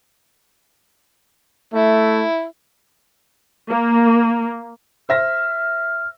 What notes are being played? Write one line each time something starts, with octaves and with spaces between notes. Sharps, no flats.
A3 E4
A#3
C5 E5 F6 A#6